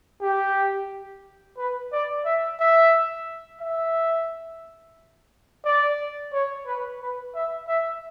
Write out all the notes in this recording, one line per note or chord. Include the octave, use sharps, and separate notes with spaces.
G4
B4
D5
E5
E5
E5
D5
C#5
B4
B4
E5
E5